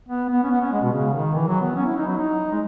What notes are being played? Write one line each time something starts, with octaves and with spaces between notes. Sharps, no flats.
B3
B3
C#4
B3
C#4
G#3
B2
C#3
D#3
E3
F#3
B3
C#4
E4
D#4
F#3
D#4
G#3